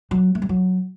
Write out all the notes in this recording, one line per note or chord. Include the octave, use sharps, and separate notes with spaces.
F#3
A3
G3
F#3